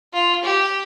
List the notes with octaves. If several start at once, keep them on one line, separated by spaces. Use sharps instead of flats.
F4
G4